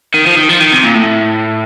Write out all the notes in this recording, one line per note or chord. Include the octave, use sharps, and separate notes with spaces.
D#3
F3
D#3
F3
D#3
C3
A#2
A2